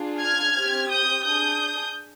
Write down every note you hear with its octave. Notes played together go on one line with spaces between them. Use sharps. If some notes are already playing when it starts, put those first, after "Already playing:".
Already playing: D4 F4 G#4
F6 G#6
C4 G4
D#6 G6
D4 G#4 D#6 G6